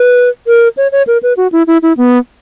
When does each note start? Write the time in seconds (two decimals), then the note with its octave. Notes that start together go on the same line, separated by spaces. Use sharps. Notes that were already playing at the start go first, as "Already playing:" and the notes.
Already playing: B4
0.47 A#4
0.77 C#5
0.92 C#5
1.07 A#4
1.23 B4
1.37 F#4
1.52 E4
1.67 E4
1.83 E4
1.97 B3